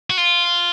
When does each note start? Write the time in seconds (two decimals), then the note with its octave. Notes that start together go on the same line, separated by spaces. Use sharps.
0.10 F#4
0.17 F4